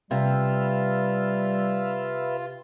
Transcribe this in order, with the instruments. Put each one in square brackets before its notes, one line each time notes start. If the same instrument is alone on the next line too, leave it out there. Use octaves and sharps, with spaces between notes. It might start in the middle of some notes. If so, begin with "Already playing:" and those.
[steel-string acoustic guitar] C3 [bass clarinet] G3 [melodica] F4 [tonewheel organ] B4 E5 F5